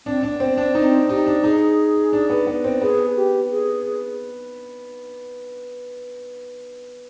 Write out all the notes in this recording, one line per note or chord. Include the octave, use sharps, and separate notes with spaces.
C4 D4
D4
B3
C4
C4 D4
C4 D#4
D#4 G4
D4
D#4 G#4
D4
B3
B3
C4
B3 G#4
G4
G#4